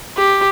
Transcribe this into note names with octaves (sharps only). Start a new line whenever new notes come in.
G4